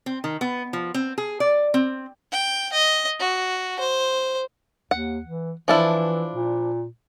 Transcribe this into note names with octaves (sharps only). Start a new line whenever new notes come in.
C4
D#3
B3
F3
C4
G#4
D5
C4
G5
D#5
F#4
C5
D#2 F#5
E3
E3 F3 D4 E4
A#2